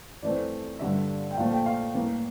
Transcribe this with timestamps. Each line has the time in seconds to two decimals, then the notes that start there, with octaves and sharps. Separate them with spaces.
0.22 F2 E3 A3 C4 D5
0.79 G2 D3 G3 E5
1.31 G5
1.37 A#2 F3 A3 F5
1.52 G5
1.66 F5
1.94 A2 E3 A#3